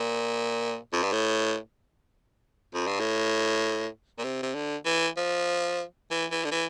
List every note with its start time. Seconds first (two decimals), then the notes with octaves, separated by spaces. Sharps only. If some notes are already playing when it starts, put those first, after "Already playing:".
Already playing: A#2
0.93 F2
1.03 G2
1.12 A2
2.74 F2
2.87 G2
3.00 A2
4.18 A#2
4.24 C3
4.43 C3
4.55 D3
4.86 E3
5.17 F3
6.11 E3
6.31 E3
6.44 D3
6.51 E3